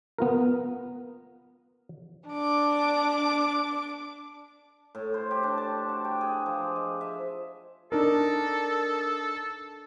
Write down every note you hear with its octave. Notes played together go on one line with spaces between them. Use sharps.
B3 F4 A#4
D4 D6
A2
C5
G4
D4
A5
F#4
G5
G#4
F3
D#5
E5
D4 D#4 A4 A#4